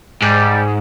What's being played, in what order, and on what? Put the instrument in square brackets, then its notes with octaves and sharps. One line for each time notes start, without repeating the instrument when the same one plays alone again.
[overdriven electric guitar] G#2 [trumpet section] G3